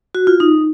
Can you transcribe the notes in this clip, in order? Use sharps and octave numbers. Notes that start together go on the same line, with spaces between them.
F#4
F4
D#4